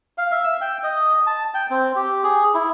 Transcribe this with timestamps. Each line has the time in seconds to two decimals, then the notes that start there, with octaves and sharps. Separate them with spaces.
0.18 F5
0.31 E5
0.44 E6
0.61 G5
0.83 D#5
1.27 A5
1.54 G5
1.70 C4
1.96 G4
2.24 G#4
2.54 E4